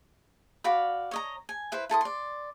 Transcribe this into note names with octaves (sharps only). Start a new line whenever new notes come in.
F#4 D5 F5 B5
C#5 D#5 A#5
G#5
E4 B4 C5
E4 A4 C6 D#6
D5 C6